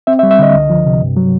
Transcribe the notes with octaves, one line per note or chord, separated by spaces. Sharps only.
C4 E5
E5
G3
E5
D3 D#5
C#2
F3
C3
G2
F#3